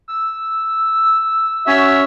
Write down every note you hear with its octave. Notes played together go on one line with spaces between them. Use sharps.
E6
C#4 F#4 E5